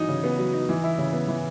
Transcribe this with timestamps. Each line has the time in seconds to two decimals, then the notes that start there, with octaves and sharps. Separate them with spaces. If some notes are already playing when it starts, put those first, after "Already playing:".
Already playing: E3 F#3 D#4
0.08 C#3
0.24 B3
0.38 F#3
0.53 D#4
0.69 E3
0.84 E4
0.98 C#3
1.13 B3
1.28 E3